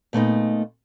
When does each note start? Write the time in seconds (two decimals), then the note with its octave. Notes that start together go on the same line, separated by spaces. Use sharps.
0.13 A#2 A3 B3 D#4